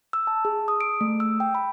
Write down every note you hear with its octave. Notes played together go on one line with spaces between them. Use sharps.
E6
A5
G#4
D#6
D7
A3
E6
G5
B5